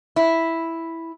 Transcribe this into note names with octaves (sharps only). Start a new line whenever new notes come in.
E4